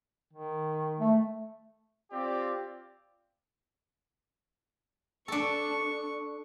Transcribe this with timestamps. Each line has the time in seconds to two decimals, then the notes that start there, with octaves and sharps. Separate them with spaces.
0.33 D#3
1.00 A3
2.11 C4 F4 G4 D5
5.28 D4 A4 C#6